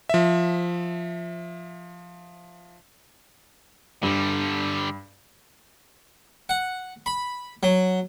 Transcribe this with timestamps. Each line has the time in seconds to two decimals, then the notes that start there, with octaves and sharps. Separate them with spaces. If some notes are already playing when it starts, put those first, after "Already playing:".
0.09 F3 E5
4.03 G2 D3 G3
6.49 F#5
7.06 B5
7.63 F#3